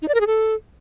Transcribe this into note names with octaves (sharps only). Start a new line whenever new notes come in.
D#4
D5
A#4
G#4
A4